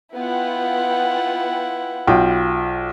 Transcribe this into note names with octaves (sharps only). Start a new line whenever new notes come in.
B3 E4 F4 F#5 G5
B1 F4 G5